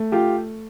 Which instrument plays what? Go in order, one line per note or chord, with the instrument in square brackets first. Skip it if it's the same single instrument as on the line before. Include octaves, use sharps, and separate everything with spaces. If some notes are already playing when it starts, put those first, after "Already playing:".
Already playing: [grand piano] A3
[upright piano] F4 G4